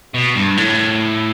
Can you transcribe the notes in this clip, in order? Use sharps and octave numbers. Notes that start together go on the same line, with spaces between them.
B2
G2
A2